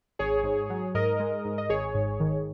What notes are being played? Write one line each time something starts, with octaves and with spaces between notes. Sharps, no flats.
G#1 G#4 C#5
G#2
F#3
G#2 A#4 D#5
G#3
G#2
D#5
G#1 G#4 C#5
G#2
D#3